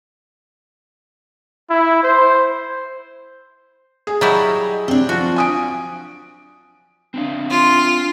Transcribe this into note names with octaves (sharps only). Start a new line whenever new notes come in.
E4
C5
G#4
F#3 G3 E4 D#5
C3 C4 D4
F3 F#4
G#5 D#6 D7
C4 D4 F5
F4